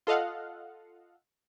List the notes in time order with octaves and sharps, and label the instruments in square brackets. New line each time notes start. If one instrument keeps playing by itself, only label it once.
[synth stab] F4 A4 D#5 F5 F#5